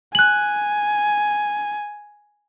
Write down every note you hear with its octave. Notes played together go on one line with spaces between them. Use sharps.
G#5 F#6 F#7